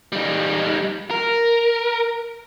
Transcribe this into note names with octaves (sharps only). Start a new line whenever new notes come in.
G3 D#4
A#4